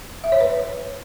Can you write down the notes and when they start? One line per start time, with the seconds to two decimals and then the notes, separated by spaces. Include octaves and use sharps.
0.24 E5
0.32 C#5
0.41 B4